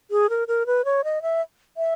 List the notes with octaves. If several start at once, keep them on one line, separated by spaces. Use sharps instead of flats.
G#4
A#4
A#4
B4
C#5
D#5
E5
E5